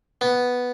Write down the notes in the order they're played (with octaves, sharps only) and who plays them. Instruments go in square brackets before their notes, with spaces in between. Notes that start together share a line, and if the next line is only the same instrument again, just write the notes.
[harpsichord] B3